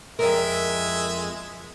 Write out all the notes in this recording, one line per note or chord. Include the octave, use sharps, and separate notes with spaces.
F2 G#3 A#4 E5